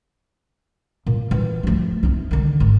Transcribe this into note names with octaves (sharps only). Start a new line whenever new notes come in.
A#2
E3
F3 A3
C4 D#4
D3 D#3
G#1